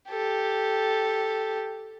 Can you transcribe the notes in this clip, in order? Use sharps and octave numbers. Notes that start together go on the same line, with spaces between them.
G4 A4